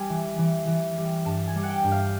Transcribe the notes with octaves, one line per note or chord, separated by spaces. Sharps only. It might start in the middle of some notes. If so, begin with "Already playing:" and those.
Already playing: G3 G#5
E3
E3
E3
G3
G2 A5
G#5
G3
F#5
G5
G2
F5